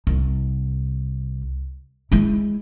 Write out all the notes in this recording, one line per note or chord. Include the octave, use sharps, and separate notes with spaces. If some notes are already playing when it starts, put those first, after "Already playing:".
C2
G#3 E4